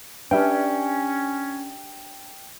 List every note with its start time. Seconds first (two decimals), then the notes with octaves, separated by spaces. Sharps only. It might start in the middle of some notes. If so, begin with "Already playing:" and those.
0.31 C#4 D4 G4 B4 E5 G5